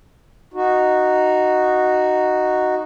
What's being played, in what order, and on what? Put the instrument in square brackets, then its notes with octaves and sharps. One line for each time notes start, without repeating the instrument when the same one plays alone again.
[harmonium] D#4 F#4